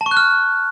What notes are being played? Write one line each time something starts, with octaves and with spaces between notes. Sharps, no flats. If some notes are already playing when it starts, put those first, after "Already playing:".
A5
C#6
F#6
F6